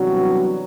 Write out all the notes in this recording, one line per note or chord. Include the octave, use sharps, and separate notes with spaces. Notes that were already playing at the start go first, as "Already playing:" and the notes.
Already playing: C3 E3 F#3 G3 B3 D4 F#4